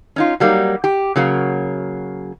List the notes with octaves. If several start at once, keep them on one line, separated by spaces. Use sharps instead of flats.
C#4 D#4 F4
F#3 G3 A#3 D#4
G4
C#3 F#3 A#3